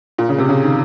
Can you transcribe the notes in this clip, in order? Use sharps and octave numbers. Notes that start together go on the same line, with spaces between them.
A#2
C#3
C3
C#3
D#3